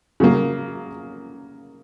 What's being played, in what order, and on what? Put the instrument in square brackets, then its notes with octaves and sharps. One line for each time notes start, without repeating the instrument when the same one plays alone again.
[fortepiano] C#3 F#3 A#3